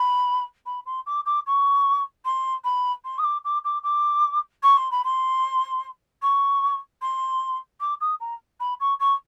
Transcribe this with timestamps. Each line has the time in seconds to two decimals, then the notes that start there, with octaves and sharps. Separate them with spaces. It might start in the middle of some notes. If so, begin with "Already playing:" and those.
Already playing: B5
0.66 B5
0.86 C6
1.06 D6
1.26 D6
1.46 C#6
2.25 C6
2.64 B5
3.05 C6
3.19 D#6
3.24 D6
3.45 D6
3.64 D6
3.83 D6
4.63 C#6
4.77 C6
4.91 B5
5.04 C6
6.22 C#6
7.02 C6
7.80 D6
8.01 D#6
8.20 A#5
8.60 B5
8.80 C#6
9.00 C#6